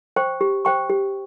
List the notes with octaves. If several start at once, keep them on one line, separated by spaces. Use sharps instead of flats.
C5 G5 C#6
G4
C5 G5 C#6
G4